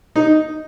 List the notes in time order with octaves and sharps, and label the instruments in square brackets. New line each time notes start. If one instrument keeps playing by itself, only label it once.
[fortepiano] D#4